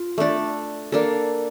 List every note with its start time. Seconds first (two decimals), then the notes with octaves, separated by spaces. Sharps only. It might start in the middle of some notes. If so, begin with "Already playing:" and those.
Already playing: F4
0.18 A3 D4 A4
0.92 A#3 D4 A4